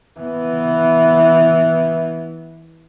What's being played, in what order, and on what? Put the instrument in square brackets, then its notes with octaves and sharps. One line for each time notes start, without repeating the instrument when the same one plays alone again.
[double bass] E3 B3